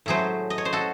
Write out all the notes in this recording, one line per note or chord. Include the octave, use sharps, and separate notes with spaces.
A2 F#3 A3 G#4 C5
D#5
C#5
C5
F#4 A4